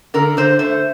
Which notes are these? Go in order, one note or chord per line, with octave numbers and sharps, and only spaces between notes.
D3 A#4
D3 C5
A3 C5